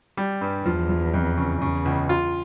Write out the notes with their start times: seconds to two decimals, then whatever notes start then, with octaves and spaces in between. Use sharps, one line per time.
0.17 G3
0.41 G2
0.66 E2 F3
0.89 F3
1.14 F2
1.37 C#3
1.62 E2 C#3
1.85 C#2
2.09 F4